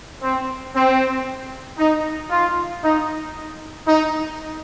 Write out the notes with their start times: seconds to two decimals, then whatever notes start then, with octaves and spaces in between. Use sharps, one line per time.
0.22 C4
0.75 C4
1.79 D#4
2.31 F4
2.83 D#4
3.88 D#4